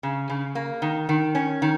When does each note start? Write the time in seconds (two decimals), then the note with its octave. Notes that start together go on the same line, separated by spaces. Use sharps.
0.03 C#3
0.30 C#3
0.55 A#3
0.82 D#3
1.09 D#3
1.35 C#4
1.62 D#3